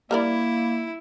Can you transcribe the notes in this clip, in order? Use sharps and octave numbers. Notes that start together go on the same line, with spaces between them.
G3 A#3 E4 A#4 D5